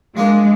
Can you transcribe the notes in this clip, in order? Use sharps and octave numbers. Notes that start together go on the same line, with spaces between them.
F3 G#3 A#3 D4